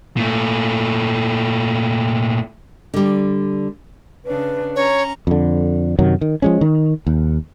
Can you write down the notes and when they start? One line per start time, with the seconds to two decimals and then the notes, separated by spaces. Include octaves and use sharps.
0.17 A#2 A3
2.94 D3 G3
4.25 C#3 D4 B4
4.76 C#4 C#5 A#5
5.27 F2 D3
5.99 F#2 C3 D#3 F#3
6.21 D#3
6.42 F3 G#3 C#4
6.61 D#3
7.07 D#2